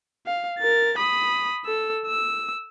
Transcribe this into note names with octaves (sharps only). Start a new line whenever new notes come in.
F5
A#4 A6
B5 D#6
A4 E6
E6